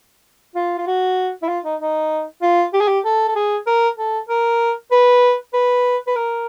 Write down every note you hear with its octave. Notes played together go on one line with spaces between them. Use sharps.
F4
F4
F#4
E4
F4
D#4
D#4
F4
G4
G#4
G4
A4
A4
G#4
A#4
A4
A#4
B4
B4
B4
A#4